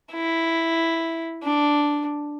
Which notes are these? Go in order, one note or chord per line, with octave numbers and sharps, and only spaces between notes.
E4
D4